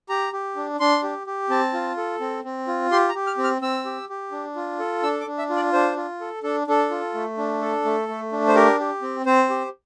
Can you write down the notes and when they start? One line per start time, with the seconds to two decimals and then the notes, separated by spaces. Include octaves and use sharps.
0.09 G4 A#5
0.33 G4
0.56 D4
0.80 D4 C6
1.03 G4
1.27 G4
1.50 C4 A5
1.73 F4
1.97 A4
2.21 C4
2.44 C4
2.68 F4
2.91 G4 C6
3.09 A#5
3.15 G4
3.27 F6
3.38 C4
3.44 F6
3.62 C4 E6
3.85 G4
4.09 G4
4.32 D4
4.56 F4
4.79 A4
5.03 D4 E6
5.20 D6
5.27 D4
5.38 E5
5.50 F4
5.56 D5
5.73 D4 C5
5.96 F4
6.21 A4
6.43 D4 A4
6.67 D4 A4
6.91 F4
7.14 A3
7.38 D4
7.62 A4
7.85 A3
8.08 A3
8.32 D4
8.48 C5
8.55 G4 A#4
8.79 G4
9.02 C4
9.26 C4 C5
9.50 G4